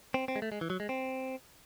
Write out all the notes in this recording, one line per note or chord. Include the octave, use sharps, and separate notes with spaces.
C4
C4
G#3
A3
G#3
E3
F#3
G#3
C4